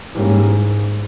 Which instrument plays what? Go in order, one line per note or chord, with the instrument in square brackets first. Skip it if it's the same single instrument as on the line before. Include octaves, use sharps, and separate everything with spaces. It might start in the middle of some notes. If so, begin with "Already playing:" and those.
[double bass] G#2 [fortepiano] E3 G3 A#3 C#4